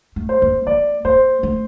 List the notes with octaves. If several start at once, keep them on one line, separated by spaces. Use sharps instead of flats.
A3
C5
A#3
A#3 D5
A#3 C5
A3